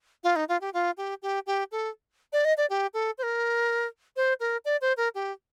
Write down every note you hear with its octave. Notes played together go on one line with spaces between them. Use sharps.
F4
D#4
F4
G4
F4
G4
G4
G4
A4
D5
D#5
D5
G4
A4
C5
A#4
C5
A#4
D5
C5
A#4
G4